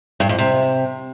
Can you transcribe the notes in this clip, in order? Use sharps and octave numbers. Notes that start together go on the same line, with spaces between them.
G2
F2
C3